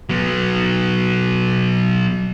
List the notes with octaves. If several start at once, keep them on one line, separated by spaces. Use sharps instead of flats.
F#3 B3